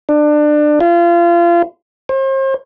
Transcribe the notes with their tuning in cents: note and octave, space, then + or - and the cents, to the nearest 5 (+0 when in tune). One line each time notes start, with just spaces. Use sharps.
D4 +25
F4 -30
C5 +40